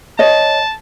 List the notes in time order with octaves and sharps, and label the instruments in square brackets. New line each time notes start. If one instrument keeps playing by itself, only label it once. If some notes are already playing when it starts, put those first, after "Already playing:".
[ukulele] C#5 D#5 [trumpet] A5